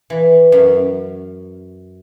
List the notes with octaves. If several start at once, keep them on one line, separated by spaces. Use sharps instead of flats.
E3
F#2